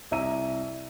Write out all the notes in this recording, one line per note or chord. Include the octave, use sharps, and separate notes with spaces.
C2 E5 A#5 D#7